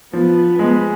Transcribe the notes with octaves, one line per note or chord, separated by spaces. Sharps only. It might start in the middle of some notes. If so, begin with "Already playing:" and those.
F3 B3
G#3 B3